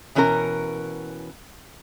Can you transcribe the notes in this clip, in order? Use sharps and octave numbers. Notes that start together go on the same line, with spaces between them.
B2 E3 C#4 D4 A#4 A#5